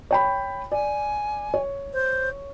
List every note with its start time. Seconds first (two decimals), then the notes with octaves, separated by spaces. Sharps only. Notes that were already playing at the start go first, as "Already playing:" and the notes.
0.11 C#5 G5 B5
0.72 D5 G#5
1.54 C#5
1.93 C5